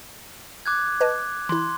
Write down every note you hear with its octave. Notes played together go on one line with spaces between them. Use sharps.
D6 F#6 G#6
B4 D#5 A5
E3 E4 C6